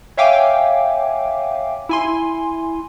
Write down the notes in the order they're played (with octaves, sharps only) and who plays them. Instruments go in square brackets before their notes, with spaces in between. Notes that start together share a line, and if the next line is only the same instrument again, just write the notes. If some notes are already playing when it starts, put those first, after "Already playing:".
[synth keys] C#5 E5 F5 G5 G#5 D6
E4 G#5 C6